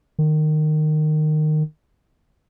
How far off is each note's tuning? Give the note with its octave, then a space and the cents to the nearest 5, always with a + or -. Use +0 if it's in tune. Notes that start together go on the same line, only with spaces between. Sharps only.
D#3 -20